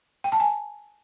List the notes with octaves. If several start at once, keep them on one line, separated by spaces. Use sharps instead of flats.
G5
A5
G#5